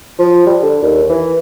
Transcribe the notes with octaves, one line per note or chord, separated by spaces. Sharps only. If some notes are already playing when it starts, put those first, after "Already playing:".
F3
G3
D3
D#2
E3